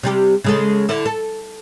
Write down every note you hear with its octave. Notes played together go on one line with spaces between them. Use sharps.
C3 G3 G4
C#3 G#3 A4
D3 E4
A4